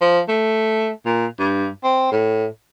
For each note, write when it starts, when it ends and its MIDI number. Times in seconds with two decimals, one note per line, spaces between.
0.01 0.20 53
0.28 0.90 57
1.05 1.26 46
1.39 1.68 43
1.83 2.07 60
2.11 2.47 45